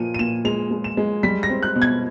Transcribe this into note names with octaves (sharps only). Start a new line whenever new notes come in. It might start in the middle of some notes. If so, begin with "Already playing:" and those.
Already playing: A#2 F3 D#7
D#7
A#2 E7
G#3 F7
G#3
E7
G#3
G3 B6
A#6
C4
F#6
B2
G#6